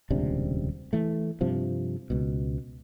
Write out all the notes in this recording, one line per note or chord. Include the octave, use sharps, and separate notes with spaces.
D#1 C#2 C3 D4
E3 A3
G2 C3 F3
C#2 B2